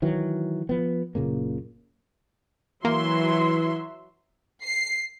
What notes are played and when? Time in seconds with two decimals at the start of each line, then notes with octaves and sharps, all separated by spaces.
0.02 D#3 E3 F#3
0.69 F3 B3
1.15 F#1 A#2 C#3 A#3
2.85 E3 F#3 A#3 E5 C6
4.64 C7